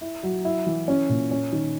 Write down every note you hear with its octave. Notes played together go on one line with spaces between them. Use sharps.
E4
F#3
E4
E3
C#4
A#2
C#4
D#3